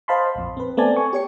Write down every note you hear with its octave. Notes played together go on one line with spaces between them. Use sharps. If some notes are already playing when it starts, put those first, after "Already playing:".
C5 D#5 F5 A5 B5 C6
A#1 F2
C4 B4
A3 B3 C4 D5 G#5 A5
G#5 C#6
G4 C#5 C#7